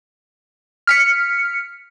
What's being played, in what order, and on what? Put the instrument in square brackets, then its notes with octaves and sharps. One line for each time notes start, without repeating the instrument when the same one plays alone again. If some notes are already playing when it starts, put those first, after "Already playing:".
[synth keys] F6 B6 C#7